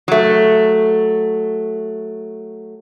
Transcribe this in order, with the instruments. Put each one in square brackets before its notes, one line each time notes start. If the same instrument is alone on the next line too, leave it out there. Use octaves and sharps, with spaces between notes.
[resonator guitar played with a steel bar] F#3 A3